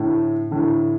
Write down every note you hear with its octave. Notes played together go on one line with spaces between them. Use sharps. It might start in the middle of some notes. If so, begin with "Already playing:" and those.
Already playing: A2 D3
A2 D3